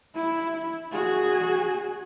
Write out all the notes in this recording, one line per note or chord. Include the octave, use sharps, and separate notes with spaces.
E4
F#4 G#4